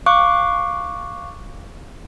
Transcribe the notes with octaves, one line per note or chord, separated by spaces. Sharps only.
F5 C#6 D6 F#6